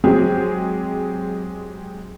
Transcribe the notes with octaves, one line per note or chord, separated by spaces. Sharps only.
F#3 G#3 C4 G4 G#4